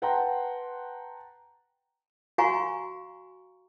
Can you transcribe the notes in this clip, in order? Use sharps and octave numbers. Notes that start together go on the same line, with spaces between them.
B4 F#5 G5 A5 A#5 C6
F#4 F5 G#5 A#5 C#6